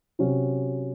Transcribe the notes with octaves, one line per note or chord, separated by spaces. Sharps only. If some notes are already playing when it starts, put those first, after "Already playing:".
C3 F#3 C#4